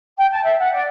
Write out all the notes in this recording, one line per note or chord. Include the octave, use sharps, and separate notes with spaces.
G5
A5
E5
F#5
D5